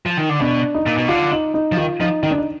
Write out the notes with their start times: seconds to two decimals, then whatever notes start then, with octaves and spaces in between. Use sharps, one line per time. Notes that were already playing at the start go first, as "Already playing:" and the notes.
0.06 F3
0.17 D#3
0.29 D3
0.40 B2 D4
0.74 D#4
0.86 A#2
0.97 B2
1.08 D3 F4
1.32 D#4
1.54 D#4
1.72 F3
1.77 D#3 F4
2.00 F3 D#4
2.23 D#3 D#4
2.31 D4
2.38 D#4